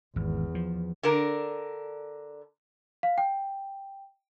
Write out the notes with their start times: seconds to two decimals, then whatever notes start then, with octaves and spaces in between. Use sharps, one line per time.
0.16 G#1 E2
0.55 F3
1.03 D3 D4 A#4
3.03 F5
3.18 G5